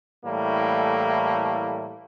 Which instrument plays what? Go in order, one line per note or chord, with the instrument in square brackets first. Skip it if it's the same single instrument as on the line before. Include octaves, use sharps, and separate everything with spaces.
[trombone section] A2 E3 G3 A3 A#3